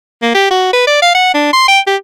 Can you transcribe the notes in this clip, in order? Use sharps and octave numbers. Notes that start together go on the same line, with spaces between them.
A#3
G4
F#4
B4
D5
F5
F#5
D4
C6
G5
G4